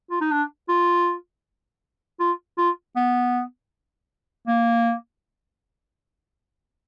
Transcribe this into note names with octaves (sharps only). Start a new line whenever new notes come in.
F4
D#4
D4
F4
F4
F4
B3
A#3